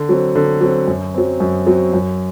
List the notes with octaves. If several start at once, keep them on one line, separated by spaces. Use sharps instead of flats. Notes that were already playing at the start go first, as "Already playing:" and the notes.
Already playing: D3
F#3 C4
D3
F#3 C4
F#2
F#3 C4
F#2
F#3 C4
F#2